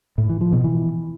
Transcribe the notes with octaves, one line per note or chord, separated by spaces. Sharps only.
A2
E3
F3
B2
E3